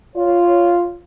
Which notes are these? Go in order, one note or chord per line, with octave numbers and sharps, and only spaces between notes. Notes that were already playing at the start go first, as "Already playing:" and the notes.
F4 C#5